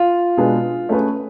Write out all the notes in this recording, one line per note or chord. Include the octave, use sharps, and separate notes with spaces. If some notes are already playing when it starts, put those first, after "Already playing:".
Already playing: F4
B2 G#3 D4 G#4 B4
A3 C#4 G#4 B4